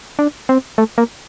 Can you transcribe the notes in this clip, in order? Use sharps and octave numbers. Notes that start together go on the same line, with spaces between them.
D4
C4
A3
A#3